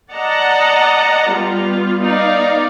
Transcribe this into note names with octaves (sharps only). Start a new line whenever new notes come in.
D5 D#5 F#5 A5 A#5
G3 B3 F4
B3 D#4 D5 F5